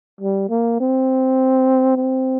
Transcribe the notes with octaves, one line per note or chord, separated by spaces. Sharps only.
G3
A#3
C4
C4